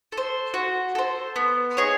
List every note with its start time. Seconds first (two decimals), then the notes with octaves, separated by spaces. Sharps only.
0.12 A4
0.17 C5
0.54 F#4
0.95 A4 C5
1.36 B3
1.77 D#4 G#4 C#5